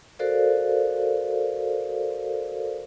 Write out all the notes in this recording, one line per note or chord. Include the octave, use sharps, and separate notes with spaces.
F#4 A4 A#4 C5 D5 F5